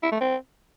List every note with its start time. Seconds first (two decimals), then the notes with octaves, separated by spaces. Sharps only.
0.03 E4
0.12 A3
0.21 C4